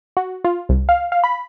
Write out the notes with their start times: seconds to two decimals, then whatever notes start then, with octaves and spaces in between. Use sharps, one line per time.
0.17 F#4
0.44 F4
0.69 C2
0.89 F5
1.12 F5
1.24 B5